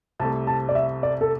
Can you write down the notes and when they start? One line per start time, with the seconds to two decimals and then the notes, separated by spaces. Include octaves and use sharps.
0.19 C2 C3 A3 A5
0.47 A5
0.69 D5
0.75 E5
1.03 D5
1.21 A4